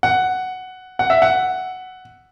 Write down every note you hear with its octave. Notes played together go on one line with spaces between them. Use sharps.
F#5
F#5
E5
F#5